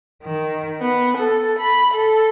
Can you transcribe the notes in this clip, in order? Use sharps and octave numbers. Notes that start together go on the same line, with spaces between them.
D#3
B3
A4
B5
A4